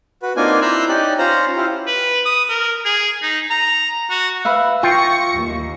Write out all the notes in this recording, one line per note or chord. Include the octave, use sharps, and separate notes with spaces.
F#4 B4
A#3 C4 D4 D#4 F4 G#5
E4 A#5 C6 E6 F#6 G6
C#4 D#4 G4 D5 F#6
C#4 F4 C5 A#5
E4 F4 G4
B4
D#6
A#4
G#4
D#4
A#5
F#4
B4 E5 F5
F4 G5 C#6 A#6 C#7
D#2